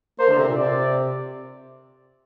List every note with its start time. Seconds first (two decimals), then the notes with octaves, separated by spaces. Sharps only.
0.19 A#3 C5
0.28 D3
0.37 C3
0.48 A#2
0.56 C3 D5